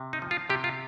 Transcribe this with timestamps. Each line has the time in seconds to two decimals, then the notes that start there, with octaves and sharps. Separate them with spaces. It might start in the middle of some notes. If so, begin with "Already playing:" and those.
Already playing: C3
0.13 D#4
0.22 F3
0.31 F4
0.50 C3 G4
0.64 F4